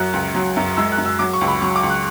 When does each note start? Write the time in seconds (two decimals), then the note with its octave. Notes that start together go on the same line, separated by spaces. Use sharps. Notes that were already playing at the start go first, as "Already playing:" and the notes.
Already playing: F#2 F#3 F#6
0.13 C#2
0.35 F#3
0.56 F#2
0.77 G#3 E6
0.92 F#6
0.98 F#2
1.05 E6
1.19 F#3 D6
1.33 C#6
1.41 C#2
1.48 B5
1.62 F#3 C#6
1.76 D6
1.83 C#2
1.90 F#6